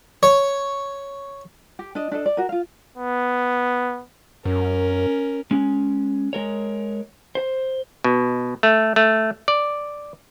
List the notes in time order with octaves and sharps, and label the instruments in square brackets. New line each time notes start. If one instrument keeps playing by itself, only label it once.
[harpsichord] C#5
[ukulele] G4
D4 D#5
D4 A4 D#5
D5
F#4 A#4
F4 F5
[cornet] B3
[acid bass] F#2 [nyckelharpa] C#4 A#4
[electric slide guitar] G#3 C#4
G#3 A#4 C#5
C5
[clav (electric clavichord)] B2
A3
A3
D5